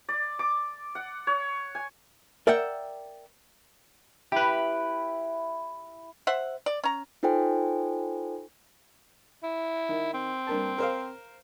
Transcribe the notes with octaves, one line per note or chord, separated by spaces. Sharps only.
D5
D6
F#5
C#5
G#5
A#4 D5 E5 F#5 G5
E4 G4 B4
C5 E5 F#5
D5
C#4 A#5
D#4 F4 A4 C5 G5 G#5
E4
D#3
C4
G2 A#3 A5
A#4 C5 F5